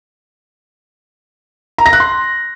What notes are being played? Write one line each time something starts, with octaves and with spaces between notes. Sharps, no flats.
A#5
A#6
F#6
C6